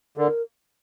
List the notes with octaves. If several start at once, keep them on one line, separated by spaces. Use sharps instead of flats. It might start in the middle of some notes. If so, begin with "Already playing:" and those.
D3 A#4